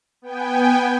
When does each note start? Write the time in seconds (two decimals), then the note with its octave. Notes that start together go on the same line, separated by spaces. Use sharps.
0.22 B3 G5 G#5